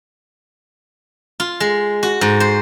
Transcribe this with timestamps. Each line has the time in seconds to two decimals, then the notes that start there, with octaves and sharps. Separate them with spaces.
1.40 F4
1.60 G#3
2.03 F#4
2.21 G#2
2.40 C5